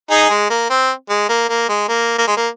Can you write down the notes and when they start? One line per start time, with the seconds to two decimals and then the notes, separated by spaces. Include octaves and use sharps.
0.11 D#4 G#4
0.30 G#3
0.50 A#3
0.70 C4
1.10 G#3
1.29 A#3
1.49 A#3
1.69 G#3
1.89 A#3
2.18 A#3
2.27 G#3
2.37 A#3